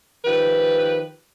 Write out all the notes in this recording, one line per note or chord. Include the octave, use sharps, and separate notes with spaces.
D#3 F3 G4 B4